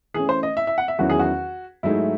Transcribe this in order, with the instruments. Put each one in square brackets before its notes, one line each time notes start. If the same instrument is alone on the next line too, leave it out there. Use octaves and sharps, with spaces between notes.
[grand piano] E3 A3 C#4 [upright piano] G#4
[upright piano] C5
D#5
E5
E5
F#5
E5
[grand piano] E2 D#3 F#3 C#4 E4 [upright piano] F#4
[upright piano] G#4
F#4
[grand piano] G#2 F#3 A3 D#4 G#4 [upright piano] E4